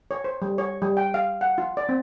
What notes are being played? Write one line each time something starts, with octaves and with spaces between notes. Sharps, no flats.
C#5
C5
G3
C#5
G3
G5
F5
F#5
F4
D5
C4